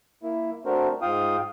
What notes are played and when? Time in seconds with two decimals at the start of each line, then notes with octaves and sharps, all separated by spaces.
0.23 A#3 E4
0.66 A3 C4 D4 F#4 A#4 C5
1.02 G#2 F4 F5 G5 D#6